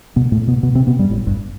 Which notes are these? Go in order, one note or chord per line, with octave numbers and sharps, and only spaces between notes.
B2 B3
A2 A3
B2 B3
B2 B3
C3 C4
B2 B3
G2 G3
A1 A2
G1 G2